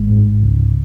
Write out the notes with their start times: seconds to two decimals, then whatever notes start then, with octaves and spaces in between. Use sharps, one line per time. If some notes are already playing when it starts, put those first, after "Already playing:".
Already playing: G#1 G#3
0.10 G#2
0.42 C#2